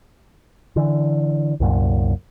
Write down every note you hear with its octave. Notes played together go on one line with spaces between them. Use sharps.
D3 E3
C2 F#2 A#2